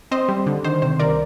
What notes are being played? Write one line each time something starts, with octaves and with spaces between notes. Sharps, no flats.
C4 C5 D#5
G3
D3
D#3 C5
C3 C5
C2 A#4 D5